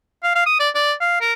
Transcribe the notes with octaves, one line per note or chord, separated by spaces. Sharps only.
F5
F5
D#6
D5
D5
F5
A#4